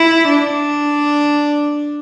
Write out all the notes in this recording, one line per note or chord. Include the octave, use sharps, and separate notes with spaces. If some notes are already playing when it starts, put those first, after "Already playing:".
Already playing: E4
D4